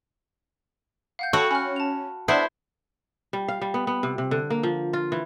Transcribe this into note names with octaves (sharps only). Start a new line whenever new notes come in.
F5 F#5 G6
F#4 A4 C#5 G5 B5 C#6
C#4 B5 F6
A5 F7
B3 D4 E4 C5 E5
G3
F5
G3
B3
B3
C3
C3
D3
A#3
F3
F4
E3